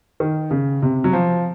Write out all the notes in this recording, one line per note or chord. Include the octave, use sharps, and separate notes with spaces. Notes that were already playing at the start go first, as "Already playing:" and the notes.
D#3
C#3
C3
F#3
F3